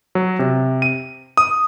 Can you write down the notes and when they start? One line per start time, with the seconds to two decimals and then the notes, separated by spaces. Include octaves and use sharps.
0.15 F#3
0.39 C3
0.82 D#7
1.37 D#6